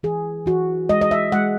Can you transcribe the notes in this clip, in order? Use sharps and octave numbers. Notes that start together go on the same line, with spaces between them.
E3 G#4
E3 F#4
G#3 D#5
D#5
E5
G#3 F#5